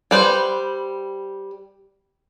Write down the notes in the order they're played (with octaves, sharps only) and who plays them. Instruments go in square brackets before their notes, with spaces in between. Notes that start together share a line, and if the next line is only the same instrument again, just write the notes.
[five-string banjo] G3 B4 C5